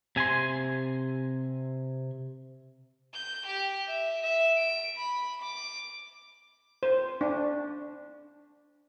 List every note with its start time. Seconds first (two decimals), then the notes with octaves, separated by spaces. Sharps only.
0.16 C3 G#5 B5 C6
3.14 G6
3.47 G4
3.88 E5
4.23 E5
4.57 D7
4.96 B5
5.42 D6
6.83 C5
7.21 D4